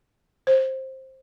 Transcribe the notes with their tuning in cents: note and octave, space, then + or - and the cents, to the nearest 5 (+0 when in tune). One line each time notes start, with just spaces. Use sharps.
C5 +15